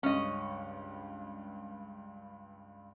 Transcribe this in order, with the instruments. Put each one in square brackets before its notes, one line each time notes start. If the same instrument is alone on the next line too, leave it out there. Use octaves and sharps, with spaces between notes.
[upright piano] C#2 G2 [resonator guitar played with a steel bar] C#4 D#5